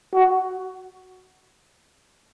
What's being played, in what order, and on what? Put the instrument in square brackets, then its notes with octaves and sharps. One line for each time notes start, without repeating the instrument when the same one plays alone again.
[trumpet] F#4